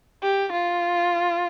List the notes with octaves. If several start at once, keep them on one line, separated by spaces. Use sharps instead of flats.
G4
F4